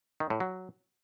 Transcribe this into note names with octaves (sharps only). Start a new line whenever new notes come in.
D#3
A2
F#3